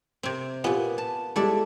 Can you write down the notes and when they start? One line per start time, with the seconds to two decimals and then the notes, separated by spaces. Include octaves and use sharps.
0.23 C3 C4
0.64 A#2 B3 F4 G4 G#5
0.98 A5
1.36 G3 G#3 E4 A4 D5